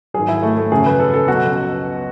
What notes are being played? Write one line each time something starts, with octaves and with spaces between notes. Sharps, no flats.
G#2 D#3 F#3 G#4
E4
A3
A3
F#2 C#3 F#3 G#4
B4
A4
A4
C#2 B2 F#3 F#4